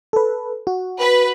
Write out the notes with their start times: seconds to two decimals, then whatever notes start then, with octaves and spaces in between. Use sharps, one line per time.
0.13 A4 B4
0.67 F#4
0.99 B4